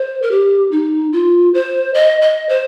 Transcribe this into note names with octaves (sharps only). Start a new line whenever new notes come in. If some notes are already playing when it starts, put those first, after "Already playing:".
Already playing: C5
A#4
G4
D#4
F4
C5
D#5
D#5
C5